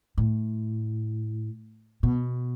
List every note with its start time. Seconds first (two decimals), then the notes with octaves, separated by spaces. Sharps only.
0.18 A2
2.03 B2